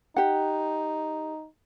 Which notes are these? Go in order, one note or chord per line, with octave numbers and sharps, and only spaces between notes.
D#4 G4 F#5